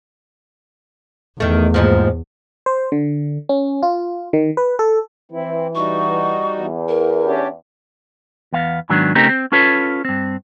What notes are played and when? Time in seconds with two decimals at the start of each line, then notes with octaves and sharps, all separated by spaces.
1.40 E2 D#3 A3
1.74 D#2 G#2 F3
2.66 C5
2.92 D3
3.49 C#4
3.83 F4
4.33 D#3
4.57 B4
4.79 A4
5.32 E3 C4 E4
5.75 G3 D#4 F#4 C#6
6.57 E2
6.89 A#4
7.24 C#4 D4 G4
8.53 E2 B3 F5
8.89 G#2 D#3 F#3 B3 D4
9.15 C#3 A3 C4 D#4 G4 A#4
9.29 C4
9.52 C#4 F4 A4 B4 C#5
10.05 G2 C4